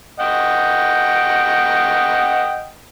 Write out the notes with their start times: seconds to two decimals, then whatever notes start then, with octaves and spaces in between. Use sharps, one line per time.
0.20 D#5 F#5 G5